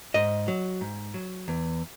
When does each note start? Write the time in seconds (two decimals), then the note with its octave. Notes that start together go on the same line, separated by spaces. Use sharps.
0.14 G#2 D#5
0.48 F#3
0.81 G#2
1.14 F#3
1.48 E2